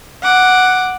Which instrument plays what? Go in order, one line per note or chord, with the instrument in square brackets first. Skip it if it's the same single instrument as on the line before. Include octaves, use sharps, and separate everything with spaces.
[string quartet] F#5 D6